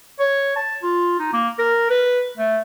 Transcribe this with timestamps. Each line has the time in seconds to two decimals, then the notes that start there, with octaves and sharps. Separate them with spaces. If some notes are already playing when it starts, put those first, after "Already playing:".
0.19 C#5
0.56 A5
0.83 F4
1.19 D#4
1.33 A#3
1.59 A#4
1.90 B4
2.38 A3